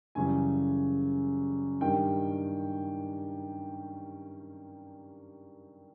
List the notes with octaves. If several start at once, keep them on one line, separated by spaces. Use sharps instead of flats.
F#2 C#3 E3 G3 G#5
G2 D#3 G3 G5